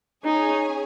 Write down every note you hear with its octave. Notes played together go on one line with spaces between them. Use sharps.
C#4 D#4 G#4 C#5 G#5